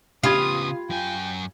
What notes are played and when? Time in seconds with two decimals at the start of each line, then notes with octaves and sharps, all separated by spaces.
0.24 C#3 B3 F4 G4 B5 D#6 G#6
0.90 F#2 G5 G#5